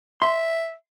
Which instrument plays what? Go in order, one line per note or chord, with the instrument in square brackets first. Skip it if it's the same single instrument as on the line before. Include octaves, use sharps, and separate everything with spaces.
[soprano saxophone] E5 [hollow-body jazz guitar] C6